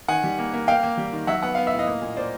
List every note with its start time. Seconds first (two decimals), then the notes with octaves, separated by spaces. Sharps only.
0.08 D#3 F#5 G#5
0.24 G3
0.39 A#3
0.53 A#3
0.68 A#3 F5 G5
0.83 A#3
0.97 G3
1.13 D#3
1.27 F#3 E5 F#5
1.43 B3 F#5
1.55 B3 F5
1.67 E5
1.73 A2
1.79 D#5 F5
1.87 A#3
2.02 A#2
2.16 A#3 C5 D5